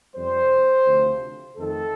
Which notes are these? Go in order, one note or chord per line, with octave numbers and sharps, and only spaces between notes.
F2 C3 G3 C5
D2 C3 F3
F2 D#3 A3 A4